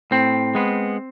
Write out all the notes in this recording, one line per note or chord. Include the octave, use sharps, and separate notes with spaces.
A2 C4
G#3 B3